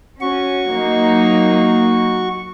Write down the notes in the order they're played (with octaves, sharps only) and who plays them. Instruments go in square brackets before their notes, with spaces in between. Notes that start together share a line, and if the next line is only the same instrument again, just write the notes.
[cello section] C#4 [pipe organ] F#4 C#6
[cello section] F#3 A#3 D#4